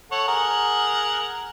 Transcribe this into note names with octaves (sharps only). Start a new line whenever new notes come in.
A4 C#5 F#5
G#4 A#4 F#5